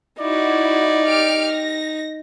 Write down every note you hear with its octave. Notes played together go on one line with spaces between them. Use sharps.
D#4 E4 F#4 D5
G4 F6 D7
A#6